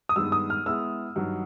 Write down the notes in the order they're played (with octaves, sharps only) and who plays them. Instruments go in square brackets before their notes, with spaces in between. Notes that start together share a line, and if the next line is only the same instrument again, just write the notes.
[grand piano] D#6
[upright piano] G2 D#3 G#3 B3 [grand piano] E6
[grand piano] D#6
F6
[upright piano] G#3 B3 E4 G#4 [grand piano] E6
[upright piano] G2 D#3 F#3